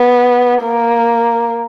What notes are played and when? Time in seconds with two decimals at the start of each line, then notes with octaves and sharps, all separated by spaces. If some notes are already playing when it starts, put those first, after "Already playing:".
Already playing: B3
0.64 A#3